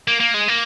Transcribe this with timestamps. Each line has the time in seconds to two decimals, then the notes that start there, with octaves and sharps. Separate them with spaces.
0.08 A#3
0.20 A#3
0.34 G#3
0.48 A#3